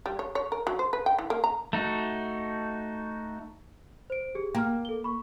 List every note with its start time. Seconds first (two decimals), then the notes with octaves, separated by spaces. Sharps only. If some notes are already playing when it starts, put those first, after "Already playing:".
0.06 G3
0.19 C#5
0.35 C#5
0.52 A#4
0.67 F#3
0.79 C5
0.93 B4
1.06 G5
1.19 E3
1.30 A#3
1.44 A#5
1.73 A3 D#4 F#4
4.10 C5 D7
4.35 G4 G#4
4.55 A#3 G5 A#5 F6
4.85 A4 G7
5.04 B5 C#6